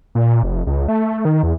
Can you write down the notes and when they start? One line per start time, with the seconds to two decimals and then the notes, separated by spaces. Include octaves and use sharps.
0.15 A#2
0.43 F1
0.67 C#2
0.88 A3
1.25 D#3
1.43 E2